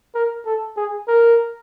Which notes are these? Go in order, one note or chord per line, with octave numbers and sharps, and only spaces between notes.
A#4
A4
G#4
A#4